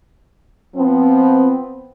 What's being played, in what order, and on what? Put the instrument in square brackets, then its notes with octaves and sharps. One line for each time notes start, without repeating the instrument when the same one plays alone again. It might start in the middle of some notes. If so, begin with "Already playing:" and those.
[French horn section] F3 B3 C4